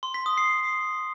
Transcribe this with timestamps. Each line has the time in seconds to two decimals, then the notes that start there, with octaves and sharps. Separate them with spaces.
0.03 C6
0.14 B6
0.26 D#6
0.37 C7